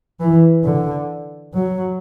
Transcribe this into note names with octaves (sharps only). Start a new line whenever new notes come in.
E3
D3
F#3